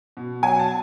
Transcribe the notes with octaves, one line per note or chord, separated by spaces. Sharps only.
B2
F#3 G#5
A5